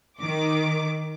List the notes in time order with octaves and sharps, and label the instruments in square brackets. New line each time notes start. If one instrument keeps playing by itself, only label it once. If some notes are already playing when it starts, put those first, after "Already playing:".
[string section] D#3 D6